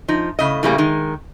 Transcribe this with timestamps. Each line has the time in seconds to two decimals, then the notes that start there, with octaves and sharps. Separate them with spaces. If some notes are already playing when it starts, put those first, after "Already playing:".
0.08 F3 D#4
0.39 A2 C#3 D#5
0.63 A2 C#3 G3 A3 A#3 G#4
0.78 D#3 G#3